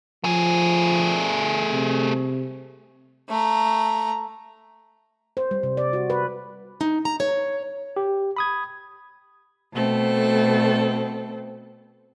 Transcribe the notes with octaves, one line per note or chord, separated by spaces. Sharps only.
F3 A3 G#4
C3
A3 A#5
C5
G3
C3
D5
F#4
B4
D#4
A#5
C#5
G4
B5 D#6 G#6
B2 A3 C4 A4